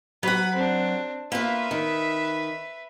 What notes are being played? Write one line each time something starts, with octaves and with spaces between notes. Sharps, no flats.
F#3 B4 F#5 B5
C4 D4
A#3 F4 B4 E5
D#3